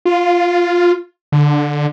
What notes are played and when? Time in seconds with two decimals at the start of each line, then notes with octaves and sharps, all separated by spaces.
0.05 F4
1.32 D3